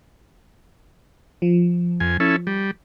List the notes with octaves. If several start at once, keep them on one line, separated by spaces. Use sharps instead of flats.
F3
F2 G#5
C#4 E4 A4
G3